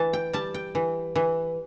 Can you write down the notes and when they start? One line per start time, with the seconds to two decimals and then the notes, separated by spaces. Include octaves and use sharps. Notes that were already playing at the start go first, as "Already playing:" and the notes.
Already playing: E3 A5
0.13 G5
0.33 G3 A5
0.54 G5
0.75 E3
1.16 E3